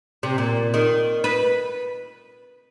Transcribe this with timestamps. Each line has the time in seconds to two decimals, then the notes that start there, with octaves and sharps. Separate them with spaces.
0.23 C3
0.38 A#2
0.74 D#3
1.24 B4